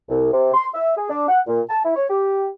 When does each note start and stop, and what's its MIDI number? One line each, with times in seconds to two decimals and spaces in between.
0.09 0.30 36
0.32 0.50 48
0.54 0.66 84
0.74 0.94 76
0.97 1.09 68
1.10 1.24 62
1.28 1.40 78
1.47 1.61 46
1.69 1.83 81
1.84 1.93 64
1.96 2.05 73
2.10 2.48 67